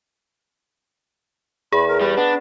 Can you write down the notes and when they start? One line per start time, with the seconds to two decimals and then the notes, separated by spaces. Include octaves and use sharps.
1.72 E2 G#4 B5
1.88 A#4
2.01 G3 B4
2.17 B3 D4